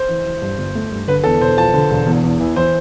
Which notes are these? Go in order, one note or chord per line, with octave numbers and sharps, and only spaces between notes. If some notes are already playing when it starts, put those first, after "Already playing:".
Already playing: C5
E3
E3
G2
G1
A3
G2
D3 B4
E2 A4
E1 C5
F3 A5
D3
E1
E2
E2
E3
E3 C5